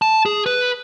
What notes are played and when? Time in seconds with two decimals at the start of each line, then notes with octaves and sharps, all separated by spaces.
0.02 A5
0.26 G#4
0.46 B4